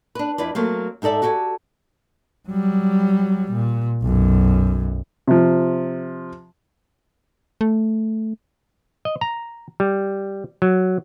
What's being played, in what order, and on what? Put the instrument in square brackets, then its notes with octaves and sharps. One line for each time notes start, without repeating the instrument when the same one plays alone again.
[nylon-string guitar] D4 B4
F2 E4 B4 D5
F#3 A3 A#3 C4
G#2 D#4 A4 D5 E5
F#4 G4 A4 G5 G#5
[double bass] F#3 G3
A#2
B1 F#2
[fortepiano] C3 F3
[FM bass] A3
[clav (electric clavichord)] D#5
A#5
G3
F#3